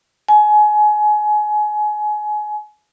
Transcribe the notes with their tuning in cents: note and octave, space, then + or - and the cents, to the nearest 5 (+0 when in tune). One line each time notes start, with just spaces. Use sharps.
G#5 +25